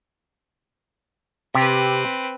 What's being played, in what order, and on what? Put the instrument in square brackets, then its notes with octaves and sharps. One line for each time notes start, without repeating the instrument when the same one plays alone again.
[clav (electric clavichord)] C3 G4 [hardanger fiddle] C4 B4